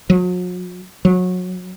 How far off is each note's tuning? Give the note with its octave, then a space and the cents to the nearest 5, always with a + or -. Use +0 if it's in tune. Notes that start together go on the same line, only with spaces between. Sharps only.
F#3 -45
F#3 -25